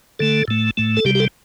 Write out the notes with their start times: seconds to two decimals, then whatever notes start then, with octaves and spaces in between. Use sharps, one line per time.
0.19 D3 A3 A4
0.48 A2 A3
0.77 A2 A3
0.97 A4
1.05 C3 G3 G4
1.15 G4
1.20 A4